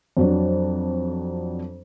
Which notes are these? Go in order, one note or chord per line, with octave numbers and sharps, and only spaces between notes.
F2 F#3 D4